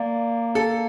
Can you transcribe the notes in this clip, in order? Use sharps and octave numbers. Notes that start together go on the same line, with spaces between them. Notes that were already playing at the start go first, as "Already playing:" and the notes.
Already playing: A#3 D5
A4